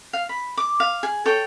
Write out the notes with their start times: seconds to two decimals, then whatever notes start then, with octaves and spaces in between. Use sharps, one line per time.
0.13 F5
0.29 B5
0.57 D6
0.80 F5
1.03 G#4
1.26 A4 C#5 G5